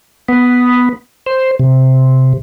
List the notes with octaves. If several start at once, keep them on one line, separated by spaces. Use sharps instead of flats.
B3
C5
C3